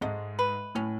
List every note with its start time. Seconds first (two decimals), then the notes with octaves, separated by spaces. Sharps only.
0.01 G#2 G#3 A3
0.39 B4
0.75 A2 C#4